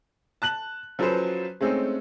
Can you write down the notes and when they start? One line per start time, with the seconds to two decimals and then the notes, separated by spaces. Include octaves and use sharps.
0.42 A5 F#6 F#7
0.99 F3 F#3 C#4 A4 B4 C5
1.61 G#3 A3 C4 C#4 D#4